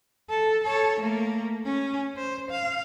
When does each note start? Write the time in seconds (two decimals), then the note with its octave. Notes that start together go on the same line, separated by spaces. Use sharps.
0.30 A4
0.64 A4 C#5
1.00 A3 A#3
1.65 C#4
2.17 C5
2.51 F5